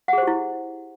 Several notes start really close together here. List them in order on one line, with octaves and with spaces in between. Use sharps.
F#5 G#4 C5 G4 E4